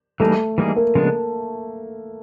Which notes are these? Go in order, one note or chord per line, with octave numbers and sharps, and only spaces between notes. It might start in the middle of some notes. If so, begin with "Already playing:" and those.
E3 G3 A3 A#3 D#4 G#4
E3 G3 A#3 D#4 G#4
A#3
C#3 F3 G#3 B3 D4